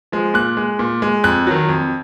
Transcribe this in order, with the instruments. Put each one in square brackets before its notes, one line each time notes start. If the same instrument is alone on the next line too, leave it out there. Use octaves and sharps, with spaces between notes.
[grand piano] F3 G#3
A#2 F#6
G#3
A#2
G#3
F2 F#6
D#3 F#3
F2